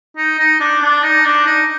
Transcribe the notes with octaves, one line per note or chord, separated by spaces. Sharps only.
D#4
D#4
D4
D4
D#4
D4
D#4